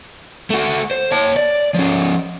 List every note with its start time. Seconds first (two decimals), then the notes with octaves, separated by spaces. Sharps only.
0.50 A3 F#4
0.91 C5
1.12 C#5 A5
1.36 D5
1.74 F3 C#4